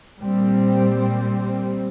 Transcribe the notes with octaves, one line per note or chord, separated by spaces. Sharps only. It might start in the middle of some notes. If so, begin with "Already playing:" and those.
A#2 G3 C4